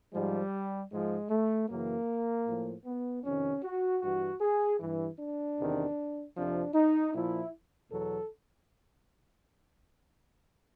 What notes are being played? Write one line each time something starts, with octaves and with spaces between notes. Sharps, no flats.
G#2 F3 G3
G#2 F3 G#3
A3
F#2 C#3 E3 A#3
A2 F3
B3
F2 C3 D#3 C#4
F#4
G2 E3 F#4
G#4
G2 E3
D4
E2 C3 D#3
F2 C3 F3 D4
D#4
A#2 F3 E4
E2 B2 F#3 A4